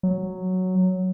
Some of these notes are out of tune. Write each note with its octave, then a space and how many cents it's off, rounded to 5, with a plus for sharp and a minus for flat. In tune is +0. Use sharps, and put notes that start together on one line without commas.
F#3 +0